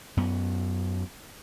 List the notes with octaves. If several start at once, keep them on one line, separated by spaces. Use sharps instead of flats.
F#2 B3